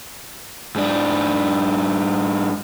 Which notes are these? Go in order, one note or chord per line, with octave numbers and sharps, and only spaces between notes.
G#2 D4